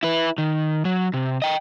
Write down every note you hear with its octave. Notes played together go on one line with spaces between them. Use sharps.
E4 B4
D#3
F#3
C3
D#5 G5